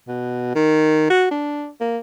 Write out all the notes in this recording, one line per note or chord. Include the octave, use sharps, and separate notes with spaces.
B2
D#3
F#4
D4
A#3